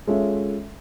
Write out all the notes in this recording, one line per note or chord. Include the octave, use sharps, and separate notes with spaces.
G#3 C#4 F4 A4 E5